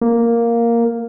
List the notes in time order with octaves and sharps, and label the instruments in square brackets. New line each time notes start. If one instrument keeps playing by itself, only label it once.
[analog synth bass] A#3